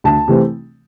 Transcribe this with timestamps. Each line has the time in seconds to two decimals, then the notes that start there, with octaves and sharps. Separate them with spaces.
0.04 D2 A5
0.28 C3 E3 A3 C4